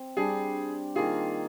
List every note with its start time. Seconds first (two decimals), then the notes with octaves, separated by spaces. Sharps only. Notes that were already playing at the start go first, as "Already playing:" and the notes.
Already playing: C4
0.17 G3 D4 G4 G#4
0.95 D#3 A#3 F4 G#4